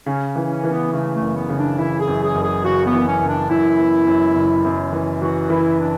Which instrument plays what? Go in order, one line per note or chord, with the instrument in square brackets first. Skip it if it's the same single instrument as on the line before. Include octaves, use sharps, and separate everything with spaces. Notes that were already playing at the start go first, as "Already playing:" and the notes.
[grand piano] C#3 [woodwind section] C#4
[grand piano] E3
[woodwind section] C#4
[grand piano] E3
[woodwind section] B3
[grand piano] C#3 [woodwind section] A3
[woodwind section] A3
[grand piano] F#1
[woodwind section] B3
[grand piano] C#3
[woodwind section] D4
[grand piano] E3 [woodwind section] E4
[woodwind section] G#4
[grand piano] F#2
[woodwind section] G#4
[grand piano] F#1
[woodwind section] G#4
[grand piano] C#3 [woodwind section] F#4
[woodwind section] B3
[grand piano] E3
[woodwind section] C#4
[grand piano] F#1
[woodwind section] D4
[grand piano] F#2 [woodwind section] E4
[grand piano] B3
F#2
F#1
F#2
E3
[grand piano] E3 [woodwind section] F#4
[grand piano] E3 [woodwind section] E4
[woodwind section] D4